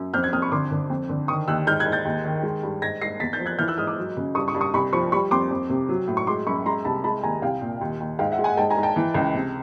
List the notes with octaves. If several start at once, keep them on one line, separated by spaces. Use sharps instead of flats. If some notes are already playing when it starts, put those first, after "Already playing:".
Already playing: F#2
F2 F6 G6
F#6 G#6
F2 D#6 F6
B5 C#6
D3 C6 D6
D3
F2
D3
D#3 C#6 D#6
D#2 E6 F#6
G#2 F6 G6
F#6 G#6
G#2
G6 A6
D#2
D#3
G#3
G2
G#2 G#6 A#6
G#2 A#6 C7
E2 A6 B6
G6 A6
F3
F#6 G#6
E3 F6 G6
E6 F#6
G#2 D#6 F6
D6 E6
F#3
C#3
G2 C#6 D#6
C#6 D#6
G2
C#6 D#6
C2 B5 C#6
F3 B5 C#6
G3 B5 C#6
F2 C6 D6
F2
C3
F#3
A2
C#6
G#3 C6 D6
F#2 B5 C#6
G#3 A#5 C6
C2 A5 B5
G#3 A5 B5
D#2 G#5 A#5
C2 F5 G5
A#2
D#2
D#2
G#2 F5 G5
E5 F#5
G#3
F#5 G#5
G#2 G5 A5
G#5 A#5
G#2
G5 A5
E3
C#2
C3